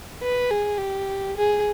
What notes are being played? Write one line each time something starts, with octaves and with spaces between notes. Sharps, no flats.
B4
G#4
G4
G#4